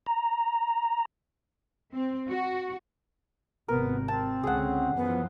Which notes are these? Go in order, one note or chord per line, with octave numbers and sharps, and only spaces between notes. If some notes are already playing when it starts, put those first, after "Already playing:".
A#5
C4
F#4
G#1 C3 B3 A#4
C4 A5
C#2 D3 C#4 G#4 F#5
F#2 E3 F3 B3